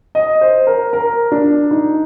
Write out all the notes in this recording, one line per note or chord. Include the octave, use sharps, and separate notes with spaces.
D#5
C5
A#4
A#4
D4
D#4